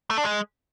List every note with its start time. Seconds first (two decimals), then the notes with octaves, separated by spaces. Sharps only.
0.10 A3
0.18 D4
0.25 G#3